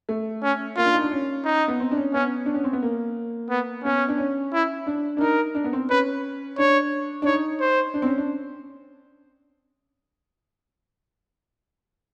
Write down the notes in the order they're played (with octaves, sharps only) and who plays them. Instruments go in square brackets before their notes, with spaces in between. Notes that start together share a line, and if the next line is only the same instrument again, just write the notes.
[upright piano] A3
[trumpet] C#4
[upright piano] A#3 [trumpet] F4
[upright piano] D4
D#4
D4
C#4
[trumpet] D#4
[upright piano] B3
C4
D4
C#4
[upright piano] B3 [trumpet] C#4
[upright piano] D4
C#4
C4
B3
A#3
[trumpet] B3
[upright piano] B3 [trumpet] C#4
[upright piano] D4
C#4
[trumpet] E4
[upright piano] D4
D4
[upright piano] D#4 [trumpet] A#4
[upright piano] D4
B3
C4
[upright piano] C#4 [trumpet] B4
[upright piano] D4 [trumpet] C#5
[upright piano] D4
[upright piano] D#4 [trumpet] C#5
[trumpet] C5
[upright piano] D4
C4
C#4
D4